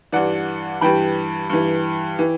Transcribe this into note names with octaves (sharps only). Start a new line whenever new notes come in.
G2 E3 D5 F#5
G2 E3 G5 B5
G2 E3
E3